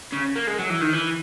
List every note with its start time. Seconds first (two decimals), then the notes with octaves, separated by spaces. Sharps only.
0.13 C#3
0.36 A#3
0.47 G#3
0.59 F#3
0.70 E3
0.81 D#3
0.93 E3